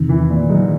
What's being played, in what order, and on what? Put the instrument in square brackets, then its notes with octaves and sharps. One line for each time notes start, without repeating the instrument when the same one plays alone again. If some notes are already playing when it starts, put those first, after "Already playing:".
Already playing: [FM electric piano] E2 C3 D#3
[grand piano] E3
A#2
[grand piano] G#2 [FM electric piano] D#3 F#3